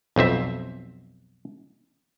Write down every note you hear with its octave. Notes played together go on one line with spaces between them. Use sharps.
B1 F2 C4 E5